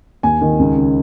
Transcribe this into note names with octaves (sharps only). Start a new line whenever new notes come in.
D#2 G#5
D#3
C#2
C#3